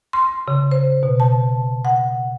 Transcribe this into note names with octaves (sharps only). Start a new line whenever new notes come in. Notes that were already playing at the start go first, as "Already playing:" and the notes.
C6
C#3
C5
B2
A5
F#5